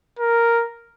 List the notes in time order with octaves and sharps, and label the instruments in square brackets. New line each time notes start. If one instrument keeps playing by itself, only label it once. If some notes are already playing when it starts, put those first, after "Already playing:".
[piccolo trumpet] A#4